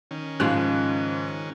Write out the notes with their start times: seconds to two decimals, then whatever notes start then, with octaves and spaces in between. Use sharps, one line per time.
0.11 D#3 C#4
0.40 G#2 C#3 F3 G#3 F#6